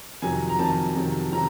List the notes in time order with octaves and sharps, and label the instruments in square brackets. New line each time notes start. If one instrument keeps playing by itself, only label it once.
[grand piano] F2 C3 D#3 F#3 G#5
A#5
F2 C3 D#3 F#3 A5
F2 C3 D#3 F#3
C3 D#3 F#3 A#5